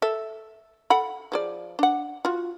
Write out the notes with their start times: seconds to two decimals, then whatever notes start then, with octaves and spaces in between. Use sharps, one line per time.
0.02 A4 E5
0.90 A4 F#5 B5
1.32 F3 G#4 D5
1.79 D4 F#5
2.25 F4 F#4